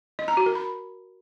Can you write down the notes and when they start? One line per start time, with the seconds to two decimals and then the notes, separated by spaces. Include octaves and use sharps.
0.19 D#5
0.28 A#5
0.37 F#4
0.46 A#4
0.55 B5